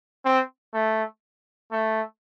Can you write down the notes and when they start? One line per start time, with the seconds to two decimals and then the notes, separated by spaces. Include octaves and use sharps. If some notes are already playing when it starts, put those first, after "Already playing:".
0.25 C4
0.74 A3
1.72 A3